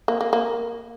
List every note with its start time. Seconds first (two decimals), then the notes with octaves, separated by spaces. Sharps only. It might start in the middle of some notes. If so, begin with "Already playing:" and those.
0.08 A#3
0.21 A#3
0.33 A#3